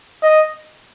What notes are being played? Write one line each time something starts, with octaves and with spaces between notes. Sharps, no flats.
D#5